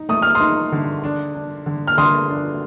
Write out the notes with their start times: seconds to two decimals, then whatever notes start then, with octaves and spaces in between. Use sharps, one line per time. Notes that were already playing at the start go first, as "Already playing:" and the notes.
Already playing: D#4
0.09 A3 D#6
0.22 F6
0.35 C6 D#6
0.40 D#4
0.72 D3
1.04 D4
1.35 D4
1.66 D3
1.87 F6
1.97 D3 C6 D#6
2.29 D4